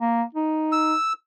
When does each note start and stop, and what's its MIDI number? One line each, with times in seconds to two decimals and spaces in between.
0.01 0.23 58
0.35 0.94 63
0.72 1.13 88